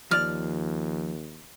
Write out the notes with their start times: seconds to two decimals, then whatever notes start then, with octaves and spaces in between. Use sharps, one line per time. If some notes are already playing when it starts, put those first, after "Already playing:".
0.11 D#2 F3 D5 F6